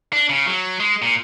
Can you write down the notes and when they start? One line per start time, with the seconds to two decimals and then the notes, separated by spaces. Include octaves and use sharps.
0.13 D4
0.29 C#3
0.46 F#3
0.80 G#3
1.02 A#2